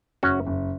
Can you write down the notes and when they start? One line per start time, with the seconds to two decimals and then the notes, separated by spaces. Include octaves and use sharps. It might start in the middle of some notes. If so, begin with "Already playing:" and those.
0.23 F#1 C#4 F#4
0.47 F#1